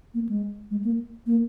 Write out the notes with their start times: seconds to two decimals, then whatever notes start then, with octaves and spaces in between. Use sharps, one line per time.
0.14 A#3
0.29 G#3
0.71 G#3
0.84 A#3
1.26 A#3